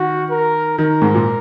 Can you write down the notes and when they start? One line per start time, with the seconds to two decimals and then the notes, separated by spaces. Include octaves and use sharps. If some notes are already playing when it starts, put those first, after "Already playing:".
Already playing: D#3 F#4
0.30 A#4
0.78 D#3 A#4
1.02 G#2
1.14 A#2